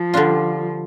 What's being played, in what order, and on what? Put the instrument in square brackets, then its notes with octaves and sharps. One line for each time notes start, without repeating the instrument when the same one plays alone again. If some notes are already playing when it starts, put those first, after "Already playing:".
Already playing: [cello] F3
[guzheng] D3 G3 D4 F4